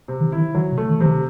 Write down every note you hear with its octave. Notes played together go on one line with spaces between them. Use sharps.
C3
D#3
E4
D#3
D#3 F#3
C3
A3
D#3
C3 E3
D#3